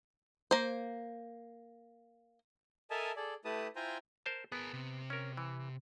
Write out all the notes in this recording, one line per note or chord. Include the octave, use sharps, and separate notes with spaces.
A#3 C5
A4 A#4 D#5 E5 G#5 A5
G#4 A4 D5
A3 E4 G4 B4 A5 D#6
E4 F4 C5 G5 G#5 A#5
A#4 C5 A5
B3 G#4 A#4
C3
C#4 A#4
E3